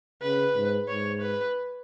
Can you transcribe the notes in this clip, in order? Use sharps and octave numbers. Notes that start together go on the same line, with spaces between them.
C#3 B4
G#2
G#2 C#5
B4